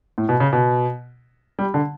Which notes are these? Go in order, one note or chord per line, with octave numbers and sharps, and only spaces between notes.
A2
B2
C#3
B2
G3
D3